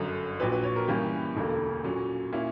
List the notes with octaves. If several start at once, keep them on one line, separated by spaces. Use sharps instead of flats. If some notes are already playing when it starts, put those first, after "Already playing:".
Already playing: G1 F#2 D3
A#1 A#2 F#3 B4
B4
C#5
A#4
G2 E3 A#3 C#4 G4
E1 D2 D3 A#3
A#2 F#3 C#4
A#2 A#3 C#4 E4